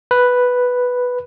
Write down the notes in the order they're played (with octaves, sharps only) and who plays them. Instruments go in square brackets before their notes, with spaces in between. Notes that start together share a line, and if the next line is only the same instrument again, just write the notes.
[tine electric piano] B4